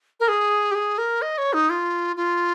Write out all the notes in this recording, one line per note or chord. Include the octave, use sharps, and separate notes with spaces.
A#4
G#4
G4
G#4
A#4
D#5
C#5
D#4
F4
F4